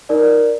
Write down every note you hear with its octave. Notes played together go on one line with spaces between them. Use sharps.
D#4 A#4 D5